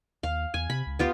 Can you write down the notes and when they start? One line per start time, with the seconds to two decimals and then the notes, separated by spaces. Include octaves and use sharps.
0.23 D#2 F5
0.54 E2 G#5
0.70 C3 B5
0.87 C#2
0.99 D2 B3 F4 G4